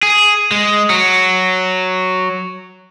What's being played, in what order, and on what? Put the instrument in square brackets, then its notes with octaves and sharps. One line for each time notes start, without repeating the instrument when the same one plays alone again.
[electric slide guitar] G#4
G#3
F#3